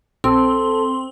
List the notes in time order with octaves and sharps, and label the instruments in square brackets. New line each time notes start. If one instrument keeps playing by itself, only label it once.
[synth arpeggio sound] A#1 [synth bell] C4 [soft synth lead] A4 [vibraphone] C6